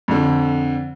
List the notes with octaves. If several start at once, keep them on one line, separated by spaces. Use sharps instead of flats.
F2 D3